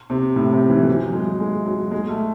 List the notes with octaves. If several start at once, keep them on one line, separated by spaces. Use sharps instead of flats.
C3
A2
C3
E3
E3
F#3
F#3
G#3
G#3
F#3
G#3
A3